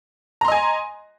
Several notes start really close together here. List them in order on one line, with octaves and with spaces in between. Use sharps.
A#5 C6 D#5 G#5